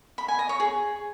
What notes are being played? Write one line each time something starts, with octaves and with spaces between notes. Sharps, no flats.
B5
G#5
D#5
C#5
G#4